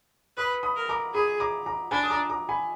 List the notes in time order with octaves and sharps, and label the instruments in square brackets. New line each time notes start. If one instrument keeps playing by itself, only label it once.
[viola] B4 [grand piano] B5 D#6
[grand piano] B5 D#6
[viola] A#4
[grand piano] A#5 D6
[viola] G#4 [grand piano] B5 D#6
[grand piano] A#5 D6
A#5 D6
[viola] D4 [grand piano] G#5 B5
[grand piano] D#6
A#5 D6
A#5 D6
G#5 B5